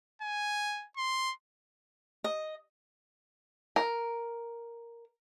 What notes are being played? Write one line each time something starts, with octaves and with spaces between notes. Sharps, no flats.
G#5
C6
D#5
A#4